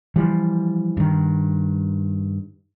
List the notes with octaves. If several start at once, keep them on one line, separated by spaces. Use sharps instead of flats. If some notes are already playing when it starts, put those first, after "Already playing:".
E3 F3 G3
G2 D#3